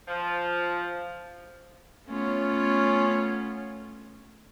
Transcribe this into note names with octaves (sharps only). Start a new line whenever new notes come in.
F3
A3 B3 C#4 F4 C#5